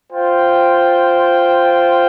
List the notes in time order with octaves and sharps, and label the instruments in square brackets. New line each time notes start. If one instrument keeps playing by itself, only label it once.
[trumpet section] F4 C5 G5